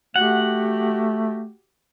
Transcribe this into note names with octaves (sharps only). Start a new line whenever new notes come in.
A3 F#4 G4 F#5